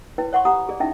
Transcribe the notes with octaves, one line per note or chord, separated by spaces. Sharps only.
E4 B4 C#5 G5
C#5 F#5 C6 C#6
G4 F#5 A#5 B5 D#6
G4 G#4 D5
C#4 D#4 E4 E5 G5